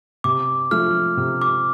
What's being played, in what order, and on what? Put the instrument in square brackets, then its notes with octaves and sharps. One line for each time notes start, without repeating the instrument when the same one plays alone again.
[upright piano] C3 [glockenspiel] D6
[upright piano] F3 A3 [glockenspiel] F6
[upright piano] C3
[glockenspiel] D6